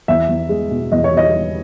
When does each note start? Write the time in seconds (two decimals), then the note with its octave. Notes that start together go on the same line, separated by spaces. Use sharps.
0.08 E2 E5
0.29 E2
0.49 G#3
0.71 B2
0.92 E2 D#5
1.04 C#5
1.12 E2 D#5
1.33 G#3